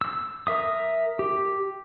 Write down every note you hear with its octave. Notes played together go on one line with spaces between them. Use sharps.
E6
A#4 E5 D#6
G4